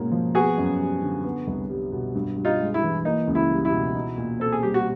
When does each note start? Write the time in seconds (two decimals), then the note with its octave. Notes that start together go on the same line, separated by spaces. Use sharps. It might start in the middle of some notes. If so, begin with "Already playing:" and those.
Already playing: G#2 B2 A#3 C#4
0.12 F3
0.35 B3 F#4 G#4
0.58 F#2
0.79 G3
1.02 D3
1.25 B3
1.47 C2
1.69 G3
1.92 B2
2.15 G2
2.37 G2
2.45 D#4 F4
2.60 G#3
2.74 E4
2.82 E3
3.05 A#3 D#4
3.28 C#2
3.35 E4
3.51 G3
3.65 E4
3.72 B2
3.95 D#4
4.18 A#2
4.40 C4 A4
4.52 G#4
4.63 G3 G4
4.74 F#4